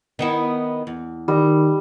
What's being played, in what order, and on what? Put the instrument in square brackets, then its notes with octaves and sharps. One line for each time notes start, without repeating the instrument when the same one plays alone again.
[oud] D#3 B3 E4
E2
[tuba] D#3 [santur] G3 D#5